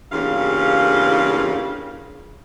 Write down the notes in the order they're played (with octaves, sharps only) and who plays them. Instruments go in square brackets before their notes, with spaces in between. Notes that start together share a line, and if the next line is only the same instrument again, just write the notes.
[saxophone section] E2 G2 C#3 A#3 F4 F5